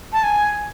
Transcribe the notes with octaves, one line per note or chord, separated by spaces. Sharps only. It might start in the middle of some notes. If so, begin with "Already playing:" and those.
A5
G#5